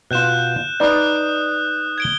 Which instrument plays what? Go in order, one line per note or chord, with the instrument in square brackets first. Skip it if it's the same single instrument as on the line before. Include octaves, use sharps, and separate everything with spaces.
[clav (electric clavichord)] B2 F4 [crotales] F#6 G6 E7
[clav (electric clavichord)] D#4 B4 D5 [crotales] D#6 F#6
[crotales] G#6 D7 G7